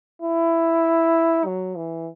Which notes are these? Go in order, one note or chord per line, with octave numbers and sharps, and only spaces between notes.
E4
F#3
E3